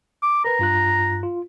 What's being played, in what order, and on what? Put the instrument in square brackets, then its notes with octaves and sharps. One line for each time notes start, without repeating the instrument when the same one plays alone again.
[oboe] D6
[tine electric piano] A#4 B4 [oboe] A#5
[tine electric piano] G2 F4 F#6
F4